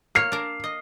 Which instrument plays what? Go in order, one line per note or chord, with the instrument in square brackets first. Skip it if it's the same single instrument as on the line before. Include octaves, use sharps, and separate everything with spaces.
[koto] A#3 C#5 [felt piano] F6 C7
[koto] D4 A#4
D#5